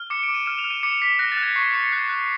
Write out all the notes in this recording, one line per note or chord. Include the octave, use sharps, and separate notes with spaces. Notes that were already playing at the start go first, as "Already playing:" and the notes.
Already playing: F6
D6 C#7
D7
D6
D#7
F6 E7
F7
F6
D#7
D6 C#7
D6 B6
F#6 A#6
A6
F#6
G#6
C#6 C7
C#6 C#7
F#6 C7
F#6